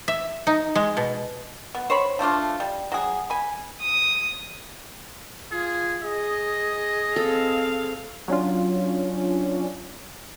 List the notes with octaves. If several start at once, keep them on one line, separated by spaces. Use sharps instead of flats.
E5
D#4
G#3
B2
B3
C5 C#5 B5
F3 A3 D4 F4
G3
F#3 G#4
G#5 B5
D#6
F4 G#4
G#4 D#5
C4 A4 F5
F#3 C#4 D4 F4